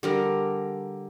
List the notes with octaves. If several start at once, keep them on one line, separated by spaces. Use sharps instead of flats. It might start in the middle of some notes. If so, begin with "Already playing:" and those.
D3 G3 A#4